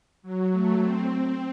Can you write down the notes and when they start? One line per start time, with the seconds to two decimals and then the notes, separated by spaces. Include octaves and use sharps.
0.22 F#3
0.51 A3
0.79 C4